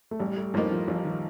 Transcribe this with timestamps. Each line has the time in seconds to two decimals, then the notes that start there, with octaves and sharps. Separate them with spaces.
0.11 A3
0.19 A1 G3
0.37 A3
0.54 A2 F3 G3 A#3 D#4
0.71 F3
0.87 A1 F3
1.05 D#3